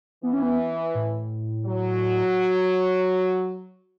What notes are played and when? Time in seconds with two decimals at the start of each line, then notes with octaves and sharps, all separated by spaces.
0.23 E3 B3
0.33 C#4
0.42 B3
0.95 A2
1.65 F#3